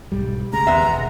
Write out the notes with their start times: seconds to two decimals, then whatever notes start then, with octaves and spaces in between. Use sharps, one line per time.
0.12 B1 G#2 G3
0.53 C#3 G#3 A#5
0.67 D#2 G#3 B3 E5
0.87 E1